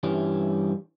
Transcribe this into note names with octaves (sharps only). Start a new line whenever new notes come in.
G2 E3 G3 C#4